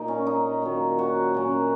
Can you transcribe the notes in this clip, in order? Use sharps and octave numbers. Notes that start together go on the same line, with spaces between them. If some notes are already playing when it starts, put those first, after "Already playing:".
Already playing: A#2 A#3 D#4
C#4
D#4
D#3 F#3 A#3
F#4
A#2 F#3 A#3 C#4